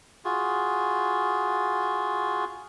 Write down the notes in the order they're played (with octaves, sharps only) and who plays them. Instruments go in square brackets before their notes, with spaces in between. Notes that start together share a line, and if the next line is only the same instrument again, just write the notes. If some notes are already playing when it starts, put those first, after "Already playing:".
[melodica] F4 F#4 G#4